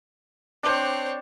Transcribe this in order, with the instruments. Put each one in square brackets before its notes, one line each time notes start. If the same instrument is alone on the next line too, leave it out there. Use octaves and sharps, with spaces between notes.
[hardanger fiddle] C4 C#5 [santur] D4 C5